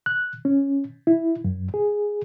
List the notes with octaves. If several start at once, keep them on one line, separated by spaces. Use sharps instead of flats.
F#6
C#4
E4
F#2
G#4